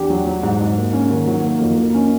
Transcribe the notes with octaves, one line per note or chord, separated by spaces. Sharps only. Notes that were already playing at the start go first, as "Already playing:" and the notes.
Already playing: E2 D4 G4
F#3
F#3
G#2
G#2
A#3
C#4
D#3
F#3
A#3
F2
A#3
C#4